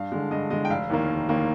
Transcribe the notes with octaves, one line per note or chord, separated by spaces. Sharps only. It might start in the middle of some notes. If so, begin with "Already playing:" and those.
Already playing: G2 F5
D3 G#3
G2 D#5
D3 G#3 D#5
G5
F1 F5
D#2 D#3 A#3
F1
D#2 D#3 A#3